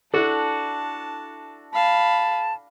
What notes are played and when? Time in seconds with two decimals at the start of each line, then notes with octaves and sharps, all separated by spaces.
0.14 D4 E4 F#4 A4 A5
1.73 F5 A5 B5